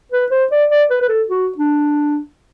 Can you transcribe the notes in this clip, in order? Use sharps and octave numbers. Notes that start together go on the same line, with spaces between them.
B4
C5
D5
D5
B4
B4
A4
F#4
D4